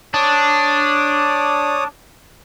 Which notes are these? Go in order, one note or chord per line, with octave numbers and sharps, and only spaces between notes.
D4 C#5 D6 D#6